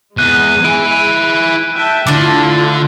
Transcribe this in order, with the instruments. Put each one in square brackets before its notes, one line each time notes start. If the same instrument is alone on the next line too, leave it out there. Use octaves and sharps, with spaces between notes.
[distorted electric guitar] E2 [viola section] G#3 [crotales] F#6 D#7
[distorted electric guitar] E4 G#5 [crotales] D7
[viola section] E5 G5 A5 [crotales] F#6
[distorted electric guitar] D3 [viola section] A3 E4 F4 [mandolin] D4 D6